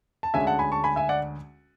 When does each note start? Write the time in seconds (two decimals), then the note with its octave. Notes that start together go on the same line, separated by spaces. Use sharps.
0.23 A5
0.34 D2 D3 G#3 C#4 E5 G#5
0.47 F#5 A5
0.59 G#5 B5
0.72 A5 C#6
0.84 G#5 B5
0.96 E5 G#5
1.09 D5 F#5